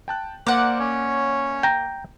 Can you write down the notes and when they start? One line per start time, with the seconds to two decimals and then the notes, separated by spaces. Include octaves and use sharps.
0.08 G5 A5 F#6
0.47 A#3 A#4 C5 D5 F#5
0.79 C#4 C#5
1.63 G5 A#5